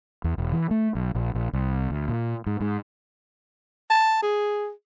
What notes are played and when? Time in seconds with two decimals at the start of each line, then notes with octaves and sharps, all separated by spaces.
0.24 E2
0.38 E1
0.53 E3
0.71 A3
0.95 B1
1.15 A#1
1.35 A#1
1.53 C2
1.90 D2
2.09 A#2
2.46 G#2
2.60 G#2
3.90 A5
4.22 G#4